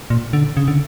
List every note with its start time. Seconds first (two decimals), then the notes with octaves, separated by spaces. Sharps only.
0.10 A#2
0.33 D3
0.57 C#3
0.68 D3